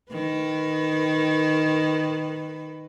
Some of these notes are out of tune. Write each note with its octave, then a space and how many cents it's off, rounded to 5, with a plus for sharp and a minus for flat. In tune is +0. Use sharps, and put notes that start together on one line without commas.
D#3 +0 B4 +15